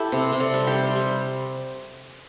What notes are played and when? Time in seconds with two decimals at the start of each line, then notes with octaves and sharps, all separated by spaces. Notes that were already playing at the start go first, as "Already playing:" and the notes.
Already playing: E4 G4 A4
0.12 C3
0.33 C3
0.40 A4 D5
0.54 G3
0.67 G4 C5
0.74 G3
0.95 G3